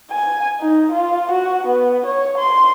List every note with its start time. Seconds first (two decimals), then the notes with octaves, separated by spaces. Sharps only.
0.11 G#5
0.60 D#4
0.92 F4
1.31 F#4
1.66 B3
2.06 C#5
2.37 C6